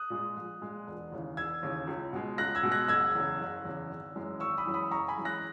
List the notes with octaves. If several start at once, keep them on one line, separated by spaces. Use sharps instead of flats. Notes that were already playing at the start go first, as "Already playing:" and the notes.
Already playing: D#6 F#6
A#2 G#3
A#1
A#2 G#3
E1
D#2 C#3 E3
E1 E6 G#6
D#2 C#3 E3
C#2
B2 G#3
C#2 F#6 A#6
E6 G#6
B2 G#3
F#6 A#6
F#1 E6 G#6
E2 C#3
F#1
E2 C#3
G#1
F#2 E3 G#3
G#1 C#6 E6
B5 D#6
F#2 E3 G#3
B5 D#6
F#1 A#5 C#6
G#5 B5
F#2 E3 G#3
F#6 A#6